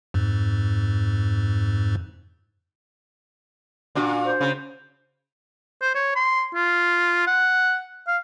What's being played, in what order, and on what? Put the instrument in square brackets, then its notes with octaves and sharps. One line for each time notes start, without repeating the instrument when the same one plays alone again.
[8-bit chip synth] F2 G#2
[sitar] A#2 D4 F#4
[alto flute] C5
[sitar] C#3
[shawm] C5
C#5
C6
F4
F#5
F5